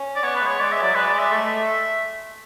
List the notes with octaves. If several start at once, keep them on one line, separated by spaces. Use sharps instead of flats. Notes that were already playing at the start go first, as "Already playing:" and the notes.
Already playing: C#4
D5
B3 C#5
B4
G#3
C#5
G#3 D5
G#3 E5
F#3 D5
G#3 B4
D5
G#3
E5
A3